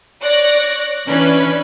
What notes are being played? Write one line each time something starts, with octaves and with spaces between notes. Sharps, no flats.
C#5 D5 F#6 A#6
E3 C#4 D4 B4